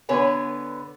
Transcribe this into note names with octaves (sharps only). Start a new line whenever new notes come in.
D3 B3 B4 C#5 G#5